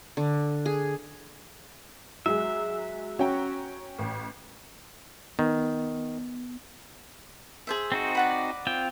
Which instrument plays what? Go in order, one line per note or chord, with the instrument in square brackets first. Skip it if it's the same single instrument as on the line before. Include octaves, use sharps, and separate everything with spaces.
[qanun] D3
G#4
[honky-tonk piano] F#3 G#3 G#4 [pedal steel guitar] E5
[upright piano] C#4 G5 [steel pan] F#4 [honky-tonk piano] C#5 A#5
[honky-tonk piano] A1
[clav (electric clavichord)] D#3 [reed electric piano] B3
[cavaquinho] G#4 C5 E5
[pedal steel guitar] C4 D#4 F#4
[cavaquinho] D5 F#5 B5
[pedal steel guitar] C4 F4 G5